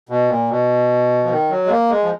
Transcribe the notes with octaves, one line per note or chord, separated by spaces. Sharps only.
B2
A#2
B2
F3
D#3
F#3
G#3
A#3
G#3
F3